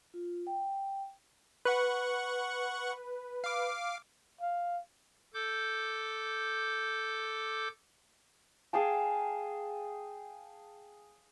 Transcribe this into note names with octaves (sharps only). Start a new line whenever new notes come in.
F4
G5
B4 F#5 C#6 F#6
F5 D6
F5
A4 D6 G6
G#4 F5 G5 A5